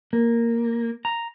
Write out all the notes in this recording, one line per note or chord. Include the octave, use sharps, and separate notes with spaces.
A#3
A#5